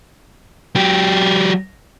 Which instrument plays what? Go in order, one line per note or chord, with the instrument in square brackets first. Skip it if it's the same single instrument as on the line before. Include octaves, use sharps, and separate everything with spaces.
[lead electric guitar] F#3 G4